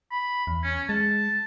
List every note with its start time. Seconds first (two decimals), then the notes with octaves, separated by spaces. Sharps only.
0.11 B5
0.47 E2
0.64 C#4
0.89 G#3 A5